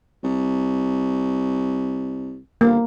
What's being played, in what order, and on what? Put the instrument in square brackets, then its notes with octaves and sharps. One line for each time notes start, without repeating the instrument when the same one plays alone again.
[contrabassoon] C2
[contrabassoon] G1 [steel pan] A#3